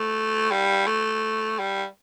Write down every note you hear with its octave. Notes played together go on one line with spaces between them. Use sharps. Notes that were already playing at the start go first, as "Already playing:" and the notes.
Already playing: A3
G3
A3
G3